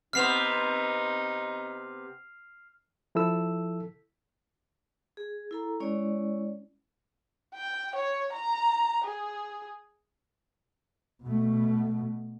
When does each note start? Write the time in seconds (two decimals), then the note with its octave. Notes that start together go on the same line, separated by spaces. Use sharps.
0.13 C3 B3 D#4 C5 F6 C7 F7
3.15 F3 E4 A4 E6
5.17 G#4
5.51 E4 A4 A#5
5.80 G#3 C#4 E4 C#5 D5
7.55 G5
7.95 C#5
8.33 A#5
9.04 G#4
11.23 B2 A3